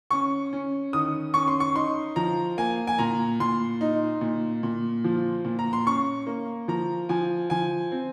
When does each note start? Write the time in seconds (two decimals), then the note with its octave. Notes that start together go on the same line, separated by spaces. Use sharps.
0.11 C#4 C#6
0.53 C#4
0.93 D#3 D#6
1.34 C#4 C#6
1.48 C6
1.60 C#6
1.75 D#4 C6
2.16 F3 A#5
2.58 A#3 G#5
2.87 G#5
2.98 A#2 A#5
3.40 A#2 C6
3.81 D#4
4.21 A#2
4.63 A#2
5.04 F3
5.45 A#2
5.59 A#5
5.73 C6
5.86 C#4 C#6
6.27 A#3
6.68 F3 A#5
7.09 F3 G#5
7.50 F3 G#5
7.92 C4